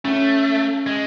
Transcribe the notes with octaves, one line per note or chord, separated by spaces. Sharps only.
A3 C#4
G#3